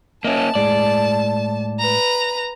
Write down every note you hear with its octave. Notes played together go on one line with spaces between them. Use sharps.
A#3 C#4 D#5 E5 A5
A2 G#3 G#4 D5
B4 A#5